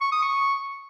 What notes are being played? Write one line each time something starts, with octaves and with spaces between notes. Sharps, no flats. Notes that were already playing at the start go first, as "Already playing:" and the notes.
C#6
D#6
C#6